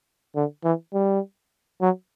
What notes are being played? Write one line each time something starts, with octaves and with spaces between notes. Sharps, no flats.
D3
E3
G3
F#3